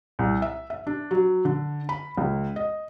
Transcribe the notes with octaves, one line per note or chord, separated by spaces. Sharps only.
C2
E5
E5
D4
F#3
D3
B5
C#2
D#5